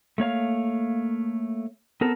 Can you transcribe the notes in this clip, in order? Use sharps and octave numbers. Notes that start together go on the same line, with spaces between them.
A3 A#3 C#5 F5
B3 C4 A4 A#4